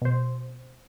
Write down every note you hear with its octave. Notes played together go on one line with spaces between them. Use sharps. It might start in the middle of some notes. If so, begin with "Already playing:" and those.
B2 C5